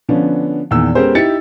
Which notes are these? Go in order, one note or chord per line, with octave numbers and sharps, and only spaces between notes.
D3 F3 B3 C#4 D4
E2 A#2 D#3 E6
G#3 B3 C#4 G4 A#4 C5
D#4 E4 G4 A6 C#7